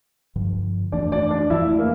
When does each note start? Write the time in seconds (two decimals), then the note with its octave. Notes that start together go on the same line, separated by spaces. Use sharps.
0.36 G2 D3 F3
0.92 F2 E3 A3 D4 D5
1.12 D4 D5
1.30 D4 D5
1.50 F2 E3 A3 E4 E5
1.79 A#3 A#4